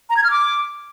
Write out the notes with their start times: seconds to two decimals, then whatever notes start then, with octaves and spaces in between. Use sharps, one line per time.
0.10 A#5
0.17 G#6
0.24 F6
0.31 D6